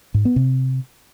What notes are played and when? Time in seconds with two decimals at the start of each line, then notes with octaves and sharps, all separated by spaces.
0.14 G#2
0.25 B3
0.36 C3